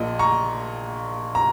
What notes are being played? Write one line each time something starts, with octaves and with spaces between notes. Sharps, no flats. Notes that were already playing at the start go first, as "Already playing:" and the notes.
Already playing: A#1 A#2 D#5
A#5 C#6
A#5